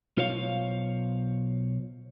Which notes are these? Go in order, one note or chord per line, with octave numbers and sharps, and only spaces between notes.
B1 F4 C5 C#5 F5